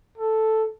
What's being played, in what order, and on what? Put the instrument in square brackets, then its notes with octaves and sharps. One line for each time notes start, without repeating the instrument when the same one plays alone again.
[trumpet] A4